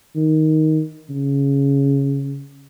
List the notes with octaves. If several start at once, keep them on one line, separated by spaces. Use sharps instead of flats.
D#3
C#3